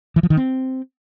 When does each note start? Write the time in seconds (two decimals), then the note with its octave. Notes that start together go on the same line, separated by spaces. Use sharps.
0.16 E3
0.23 F3
0.30 D#3
0.37 C4